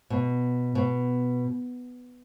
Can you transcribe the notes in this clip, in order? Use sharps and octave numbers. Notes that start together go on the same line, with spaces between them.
B2
B2